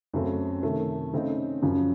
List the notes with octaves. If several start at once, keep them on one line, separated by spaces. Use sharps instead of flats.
F#2 C#3 A3 C4
C3 D#3 A3
C#3 A3 C4 D#4
F#2 C#3 F3